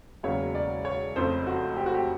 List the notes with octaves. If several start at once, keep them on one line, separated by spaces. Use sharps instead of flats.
E1 E2 C#3 F#3 A#3 C#5
D5
C#5
F1 F2 C#3 C5
F#4
G4
F#4
G4